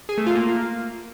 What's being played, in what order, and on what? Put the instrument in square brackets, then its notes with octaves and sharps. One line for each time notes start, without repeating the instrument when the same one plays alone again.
[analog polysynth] G#4
A3
F4
A#3